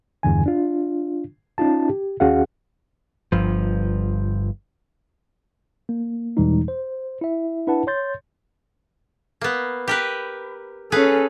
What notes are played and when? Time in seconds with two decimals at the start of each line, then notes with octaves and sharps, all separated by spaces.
0.23 E2 G2 D3 G#5
0.46 D4 F4
1.58 C#4 D#4 F4 A5
1.89 G4
2.20 D#2 C#4 F#4 G#4 F5 F#5
3.32 G1 G2 F3
5.89 A#3
6.37 E2 B2 E3 G3 G#3 D#4
6.68 C5
7.21 E4 E5
7.67 D4 E4 B4 F#5 A5
7.87 C#5 C6 G6 A6
9.41 A#3 B3
9.88 G4 A#4 B4
10.92 C#4 G#4 A4 B4 F5